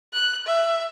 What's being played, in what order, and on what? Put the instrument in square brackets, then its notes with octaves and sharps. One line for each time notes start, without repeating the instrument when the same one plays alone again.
[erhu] F#6
E5